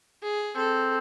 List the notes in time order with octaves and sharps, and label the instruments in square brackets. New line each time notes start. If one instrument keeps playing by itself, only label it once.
[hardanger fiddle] G#4
[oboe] C4 [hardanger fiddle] A4